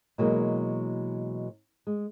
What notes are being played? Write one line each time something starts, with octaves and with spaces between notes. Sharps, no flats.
B2 E3 F#3 G#3 A#3
G#3